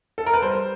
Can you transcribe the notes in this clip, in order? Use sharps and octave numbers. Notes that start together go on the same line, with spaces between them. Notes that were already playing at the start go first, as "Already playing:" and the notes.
A4
A#4
B4
G3 C5